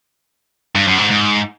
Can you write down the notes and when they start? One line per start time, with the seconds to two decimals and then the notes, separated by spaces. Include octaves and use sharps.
0.75 G2
0.88 F#2
0.98 G#2
1.11 G#2